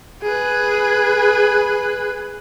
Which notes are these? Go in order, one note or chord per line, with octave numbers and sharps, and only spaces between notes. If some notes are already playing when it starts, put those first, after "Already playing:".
G#4 B4